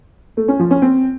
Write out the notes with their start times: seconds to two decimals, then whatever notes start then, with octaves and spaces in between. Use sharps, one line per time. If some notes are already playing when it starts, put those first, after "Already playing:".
0.37 A3
0.48 C#4
0.60 F3
0.71 C#4
0.82 C4